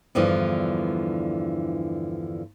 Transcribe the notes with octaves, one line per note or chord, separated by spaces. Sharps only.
E2 G2 D3 E3 F3